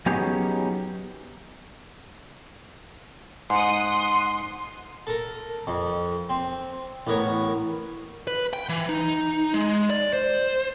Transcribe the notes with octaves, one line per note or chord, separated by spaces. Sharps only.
F#3 B3 C#4 D#4 G4 G#4
G#2 F#5 C6 D#6
A4 A#4
F2
C4
A1 B3 A#4 C#5
B4
G5
E3
D#4
G#3
D5
C5